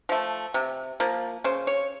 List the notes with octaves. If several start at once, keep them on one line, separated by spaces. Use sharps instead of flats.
F3 A3
C3
F3 A#3
C#3 C5
C#5